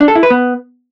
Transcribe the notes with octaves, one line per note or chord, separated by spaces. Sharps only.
D4
A4
E4
B4
B3